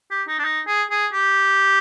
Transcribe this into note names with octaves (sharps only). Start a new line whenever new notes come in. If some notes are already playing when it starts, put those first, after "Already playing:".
G4
D#4
D4
D#4
G#4
G#4
G4